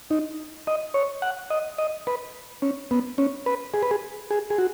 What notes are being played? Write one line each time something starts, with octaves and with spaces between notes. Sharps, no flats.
D#4
D#5
C#5
F#5
D#5
D#5
B4
C#4
B3
C#4
B4
G#4
B4
G#4
G#4
G#4
F#4